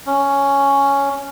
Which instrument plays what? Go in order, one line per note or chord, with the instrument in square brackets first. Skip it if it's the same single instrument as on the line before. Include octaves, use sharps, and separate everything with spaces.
[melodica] C#4